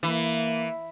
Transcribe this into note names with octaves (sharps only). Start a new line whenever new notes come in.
E3 A#3